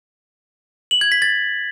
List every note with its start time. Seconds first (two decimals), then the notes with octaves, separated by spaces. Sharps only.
0.91 F#7
1.01 G#6
1.12 B6
1.22 A6